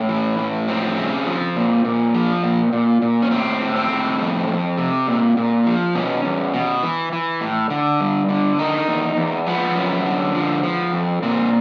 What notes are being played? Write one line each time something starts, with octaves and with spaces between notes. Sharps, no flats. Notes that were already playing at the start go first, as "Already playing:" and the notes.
Already playing: A2 C#4
E3
A2
F3 C4
C#3
F3
A#2
A#2
F3
A#2
A#2
A#2
C#4
A2 C4
A2
C4
A2
F2
F2
C3
A#2
A#2
F3
B2 C#4
E2
B2
E3
E3
A2
D3
G2
D3
D#3 D#4
E2
E2
F3 B3
F#2
D3
F3
F3
F2
A#2 C4